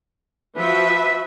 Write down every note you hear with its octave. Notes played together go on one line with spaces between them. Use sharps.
F3 F#4 B4 E5